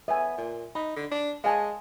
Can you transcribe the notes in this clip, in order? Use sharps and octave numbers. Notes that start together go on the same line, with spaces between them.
B3 E5 G#5
A#2
D#4 B5
D3
D4
G#3 F5 G#5 A5